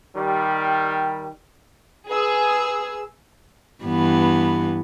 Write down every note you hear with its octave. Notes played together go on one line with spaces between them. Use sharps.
D#3 G3
G#4 B4 E6
G2 E3 B3